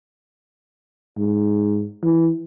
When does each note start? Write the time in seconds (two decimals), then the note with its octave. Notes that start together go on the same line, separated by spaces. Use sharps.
1.18 G#2
2.03 E3